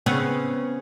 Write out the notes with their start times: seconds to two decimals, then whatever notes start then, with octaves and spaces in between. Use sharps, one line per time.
0.06 C#3 B3 C4